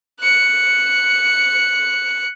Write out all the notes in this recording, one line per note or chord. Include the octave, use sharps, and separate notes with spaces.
F#6 C#7